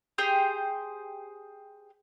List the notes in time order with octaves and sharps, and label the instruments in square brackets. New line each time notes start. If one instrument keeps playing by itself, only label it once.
[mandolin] G4 G#4 C5 G5